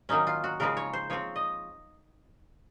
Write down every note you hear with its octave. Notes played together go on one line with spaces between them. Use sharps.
D#3 F#3 A#3 C#4 D#4
F4
F#4
C#3 F3 G#3 C4 A#4
C#5
C5
F3 C4 C#5
D#5